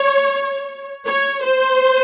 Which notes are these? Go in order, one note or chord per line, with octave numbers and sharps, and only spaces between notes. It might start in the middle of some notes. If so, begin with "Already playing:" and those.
Already playing: C#5
C#5
C5